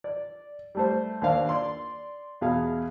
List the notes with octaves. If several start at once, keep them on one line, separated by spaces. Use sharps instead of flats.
D5
G3 A3 C5
D#2 D4 C5 F5
D5 C6
E2 B2 G#4 F5